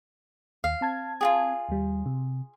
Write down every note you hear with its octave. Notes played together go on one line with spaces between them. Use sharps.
D#2 F5
C4 A5 G#6
F4 F#4 G#4
D#2 G3
C3